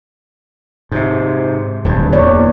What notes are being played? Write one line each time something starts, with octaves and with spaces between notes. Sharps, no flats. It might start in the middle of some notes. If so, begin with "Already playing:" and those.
G#2 C3
D1 G2
E2 A#3 C#5 D5